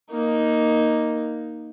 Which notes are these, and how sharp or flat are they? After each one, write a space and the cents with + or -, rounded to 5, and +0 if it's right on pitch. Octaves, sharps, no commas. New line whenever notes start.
A#3 +0 D#4 +0